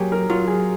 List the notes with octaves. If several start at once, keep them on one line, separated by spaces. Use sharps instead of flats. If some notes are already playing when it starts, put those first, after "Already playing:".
Already playing: F#3 A#3 G4 G#4
A#4
F#3 F4
G#4